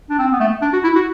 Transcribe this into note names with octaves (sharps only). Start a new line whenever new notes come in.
D4
C4
B3
A3
D4
F#4
E4
F#4